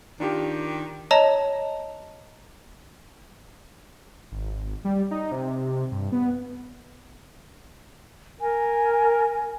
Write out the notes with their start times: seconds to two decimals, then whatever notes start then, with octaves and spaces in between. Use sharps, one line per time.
0.20 D#3 D4 F4 G4
1.11 C#5 D#5 A5 A#5
4.32 G#1
4.85 G3
5.11 D#4
5.32 C3
5.92 G2
6.12 B3
8.41 A#4 G#5